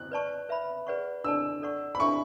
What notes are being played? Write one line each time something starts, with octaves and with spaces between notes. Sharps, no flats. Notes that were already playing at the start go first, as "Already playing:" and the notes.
Already playing: F#6
B4 D5 A5 C#6
B4 E5 B5
G#4 B4 D5 F#5 C#6
D4 A4 D5 A5 E6
A4 D5 F#5 C#6
B5
D4 A4 E5 G#5 C#6